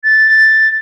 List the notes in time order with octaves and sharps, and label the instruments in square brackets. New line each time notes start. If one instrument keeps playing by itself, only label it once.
[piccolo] A6